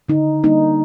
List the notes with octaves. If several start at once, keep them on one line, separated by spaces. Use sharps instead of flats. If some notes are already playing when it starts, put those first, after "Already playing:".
D3 D#4
G3 A#3 D4 D#4